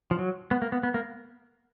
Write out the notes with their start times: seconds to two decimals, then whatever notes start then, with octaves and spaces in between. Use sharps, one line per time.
0.11 F3
0.19 F#3
0.51 B3
0.62 A#3
0.72 B3
0.83 B3
0.94 A#3